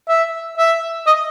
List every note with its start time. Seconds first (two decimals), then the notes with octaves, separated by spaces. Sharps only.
0.08 E5
0.58 E5
1.07 D#5